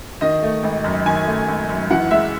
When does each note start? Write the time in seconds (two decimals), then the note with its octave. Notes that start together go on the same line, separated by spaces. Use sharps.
0.21 D#3 D#5
0.42 A3
0.63 G#1
0.84 F#2
1.06 D#3 G#5
1.27 A3
1.48 G#1
1.69 F#2
1.91 E3 F#5
2.11 G#3 E5